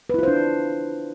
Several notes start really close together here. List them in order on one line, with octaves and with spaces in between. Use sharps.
B4 E4 F4 C5 D4